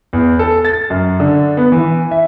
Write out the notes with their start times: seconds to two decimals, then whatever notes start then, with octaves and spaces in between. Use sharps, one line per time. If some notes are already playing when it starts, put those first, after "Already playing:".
0.13 E2
0.39 A4
0.65 A6
0.90 F#2
1.20 D3
1.57 B3
1.72 E3
2.11 E5